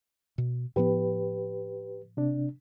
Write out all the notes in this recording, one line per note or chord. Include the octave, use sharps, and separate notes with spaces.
B2
A2 F3 B3 G4 B4
C3 D4